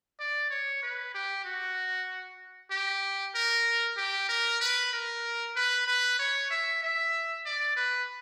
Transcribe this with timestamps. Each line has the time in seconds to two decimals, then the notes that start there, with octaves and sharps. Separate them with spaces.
0.20 D5
0.50 C#5
0.83 B4
1.14 G4
1.45 F#4
2.71 G4
3.35 A#4
3.97 G4
4.29 A#4
4.61 B4
4.93 A#4
5.56 B4
5.87 B4
6.19 C#5
6.50 E5
6.82 E5
7.45 D5
7.76 B4